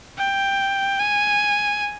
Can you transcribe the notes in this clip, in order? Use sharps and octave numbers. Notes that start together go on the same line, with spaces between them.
G5
G#5